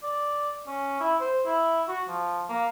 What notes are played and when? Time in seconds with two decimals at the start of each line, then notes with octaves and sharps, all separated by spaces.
0.03 D5
0.67 C#4
1.01 E4
1.21 C5
1.46 E4
1.88 F#4
2.08 F3
2.50 A#3